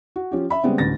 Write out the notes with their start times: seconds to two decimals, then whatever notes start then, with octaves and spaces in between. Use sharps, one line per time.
0.16 F#4
0.31 F3 C#4 G4
0.50 E5 B5
0.63 C#3 G3 G#3 B3 C4
0.78 A1 D2 A6 A#6